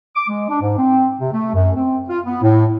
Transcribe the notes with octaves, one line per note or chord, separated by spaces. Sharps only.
D6
G#3
D4
G#2
C4
C3
A3
F#2
C4
F4
B3
A2